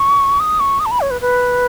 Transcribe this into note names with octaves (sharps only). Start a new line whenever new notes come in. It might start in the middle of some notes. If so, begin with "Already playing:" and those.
Already playing: C#6
D#6
C#6
D#6
A5
B5
C#5
B4
B4